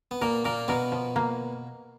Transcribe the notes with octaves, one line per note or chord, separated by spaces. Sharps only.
B3
A#2 A#3 A#4
A#2 A#3 A#4
B2 B3 A#4
F3
A#3